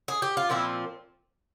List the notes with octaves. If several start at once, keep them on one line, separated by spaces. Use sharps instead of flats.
G#4
G4
F4
A#2 F3 C4 E4